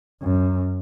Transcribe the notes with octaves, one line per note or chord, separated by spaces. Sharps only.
F#2